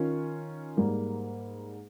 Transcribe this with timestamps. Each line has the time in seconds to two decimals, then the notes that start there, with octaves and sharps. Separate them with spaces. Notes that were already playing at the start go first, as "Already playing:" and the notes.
Already playing: D#3 C#4 F4
0.77 G#2 G3 A#3